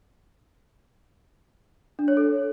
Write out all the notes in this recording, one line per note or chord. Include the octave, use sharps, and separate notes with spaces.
D4
C#5
A4